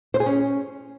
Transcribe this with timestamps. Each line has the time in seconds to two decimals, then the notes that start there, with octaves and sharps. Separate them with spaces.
0.14 C5
0.20 G#4
0.26 C#4